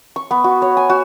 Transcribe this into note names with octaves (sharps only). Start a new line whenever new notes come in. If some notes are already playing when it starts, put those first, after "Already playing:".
C#6
B3
F#4
C#5
G#5
F#4